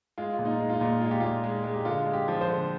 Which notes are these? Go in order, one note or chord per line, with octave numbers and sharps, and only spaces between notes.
G#3 F4
A#2 F4
D#4
G#3
F4
D#4
A#2
G#3 F4
G4
A#2 F4
G#3
G#3
G4
D3 F4
G#3
G4
F3
C5
D3